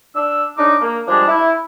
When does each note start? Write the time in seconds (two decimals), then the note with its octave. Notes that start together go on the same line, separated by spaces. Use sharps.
0.14 D4 E6
0.58 C#3 D4 D#4 D6
0.81 A#3
1.08 F3 G3 G#3 D4
1.28 E4